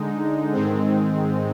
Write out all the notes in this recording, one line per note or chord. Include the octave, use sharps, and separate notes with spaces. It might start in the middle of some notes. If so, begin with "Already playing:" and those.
Already playing: D3 G#3 D#4
G#2 D#3 G#3 C4